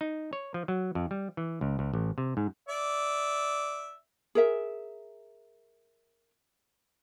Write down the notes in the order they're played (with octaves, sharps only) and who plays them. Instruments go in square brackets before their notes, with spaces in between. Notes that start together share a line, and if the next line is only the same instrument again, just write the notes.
[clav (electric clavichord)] D#4
C#5
F3
F#3
F2
G3
E3
C#2
C#2
A1
C3
G#2
[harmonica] D5 E5
[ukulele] G#4 A#4 E5